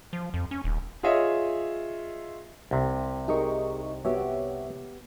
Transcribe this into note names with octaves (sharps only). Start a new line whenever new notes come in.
F3
F2
C#4
D#1
F4 G#4 C#5 D#5 E5
C2 C3
D#4 G4 G#4 A#4 D#5 C#6
B3 F#4 G4 C#5 E5